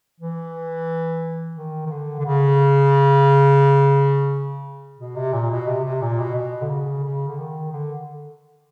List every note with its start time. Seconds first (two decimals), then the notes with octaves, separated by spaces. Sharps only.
0.20 E3
1.56 D#3
1.86 D#3
1.90 D3
2.19 D3
2.25 C#3
4.98 B2
5.16 C3
5.32 A#2
5.50 B2
5.67 C3
5.84 C3
6.01 A#2
6.19 B2
6.35 B2
6.61 D3
6.69 C#3
7.04 C#3
7.27 D3
7.38 D#3
7.72 D3